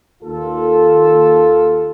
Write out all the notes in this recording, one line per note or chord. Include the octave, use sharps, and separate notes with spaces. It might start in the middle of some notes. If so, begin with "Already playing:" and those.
D#2 F4 A4